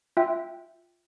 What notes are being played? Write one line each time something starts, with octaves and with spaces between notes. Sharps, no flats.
F4 E5 G5